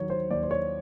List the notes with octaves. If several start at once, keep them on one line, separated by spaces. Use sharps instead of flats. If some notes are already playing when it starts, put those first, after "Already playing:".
Already playing: D#2 D#3 F#3 C#5
C5
D#2 D5
C5
C#5